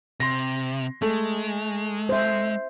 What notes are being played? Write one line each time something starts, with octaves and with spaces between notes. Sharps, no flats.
C3 C6 A#6
G#3 A3
C5 E5